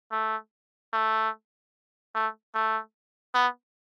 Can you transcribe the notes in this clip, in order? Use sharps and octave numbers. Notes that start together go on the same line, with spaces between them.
A3
A3
A3
A3
B3